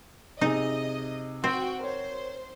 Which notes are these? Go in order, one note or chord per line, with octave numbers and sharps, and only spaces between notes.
C3 D#4 G#4 D#5
C4 F#4 G5
A#4 C5 C#5